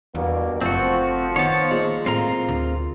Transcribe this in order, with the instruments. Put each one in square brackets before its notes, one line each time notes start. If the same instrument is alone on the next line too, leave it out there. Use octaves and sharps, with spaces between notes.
[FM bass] E2 [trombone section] G2 B2 A#3
[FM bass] F#1 [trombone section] F3 [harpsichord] A3 [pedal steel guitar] C4 F#4
[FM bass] D#3 [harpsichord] B3 [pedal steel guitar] C#5 A5
[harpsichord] A#2 G#3
[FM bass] A2 [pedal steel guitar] C4 F4 A#5
[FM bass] D2